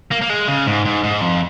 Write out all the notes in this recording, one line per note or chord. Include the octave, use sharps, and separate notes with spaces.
A#3
A#3
G#3
C#3
G#2
G#2
G#2
F2